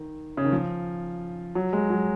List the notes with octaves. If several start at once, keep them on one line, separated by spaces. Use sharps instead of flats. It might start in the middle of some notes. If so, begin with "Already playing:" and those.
Already playing: D#3
C#3
D#3
F3
F#3
G#3
F#3